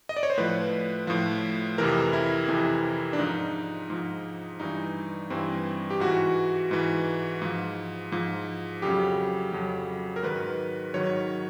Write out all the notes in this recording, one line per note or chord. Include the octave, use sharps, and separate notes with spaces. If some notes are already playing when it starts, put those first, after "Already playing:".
D#5
D5
C#5
C5
A2 F3 B4
A2 F3
F2 C3 E3 A#4
E4
F2 C3 E3
D4
G#2 F3 D#4
G#2 F3
G2 E3 D#4
G2 E3 C4
G4
G#2 E3 F#4
G#2 E3
G#2 F3
G#2 F3
F2 C#3 F#3 G4
F2 C#3 F#3
A#4
G#2 D#3 F#3 B4
G#2 D#3 F#3 C#5